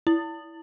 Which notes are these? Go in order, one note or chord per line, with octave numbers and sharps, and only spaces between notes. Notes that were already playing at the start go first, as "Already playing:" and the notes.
E4